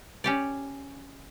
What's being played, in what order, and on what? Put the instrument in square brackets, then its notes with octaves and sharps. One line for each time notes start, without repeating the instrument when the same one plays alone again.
[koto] C#4 G4 D5